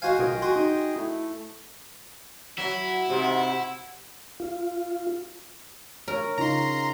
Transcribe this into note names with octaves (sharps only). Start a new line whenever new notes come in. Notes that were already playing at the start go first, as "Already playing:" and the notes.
G#3 F#4 C5 F5 G#5
B1 F4 G#4 A#4 D#5 G5
F#4 G#5 C6
D#4
A3 E4
F#3 E4
G#2 C3
F4
A#4 C#5
C#3 D#4 F4 A#5 C6